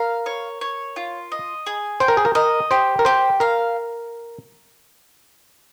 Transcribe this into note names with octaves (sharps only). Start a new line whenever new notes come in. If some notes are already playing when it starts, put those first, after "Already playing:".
Already playing: A#4 F5
C#5
C#5
F4
D#5
G#4
C5 G5
A#4
G#4
A#4
A#4 D#5
G4 C5
A#4
G4 C5
A#4 F5